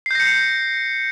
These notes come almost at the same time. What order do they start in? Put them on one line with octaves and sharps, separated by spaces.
C7 G6 A#6 C#7